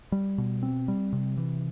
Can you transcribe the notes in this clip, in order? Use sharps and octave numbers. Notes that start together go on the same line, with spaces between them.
G3
B2
C4
G3
C3
E3